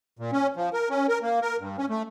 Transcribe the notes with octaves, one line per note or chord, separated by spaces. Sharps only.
A#2
C#4
F3
A#4
C#4
A#4
A#3
A#4
G2
C#4
A3